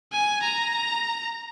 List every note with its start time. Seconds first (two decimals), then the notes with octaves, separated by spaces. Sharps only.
0.12 G#5
0.43 A#5